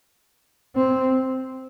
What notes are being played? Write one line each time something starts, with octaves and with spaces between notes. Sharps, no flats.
C4